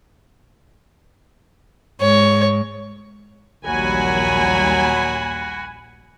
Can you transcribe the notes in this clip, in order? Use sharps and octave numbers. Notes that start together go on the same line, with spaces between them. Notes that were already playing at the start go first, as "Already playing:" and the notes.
G#2 C#5
A#1 D#2 F#3 G3 F#4 G#5 B5